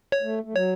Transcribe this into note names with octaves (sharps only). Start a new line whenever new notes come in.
C#5
A3
A3
F#3 C#5